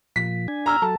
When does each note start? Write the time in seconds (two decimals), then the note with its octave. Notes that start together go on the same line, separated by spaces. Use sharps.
0.16 A#2 F3 B6
0.48 D4 G#5
0.66 A#5 E6 F6
0.82 F#3 A4 A5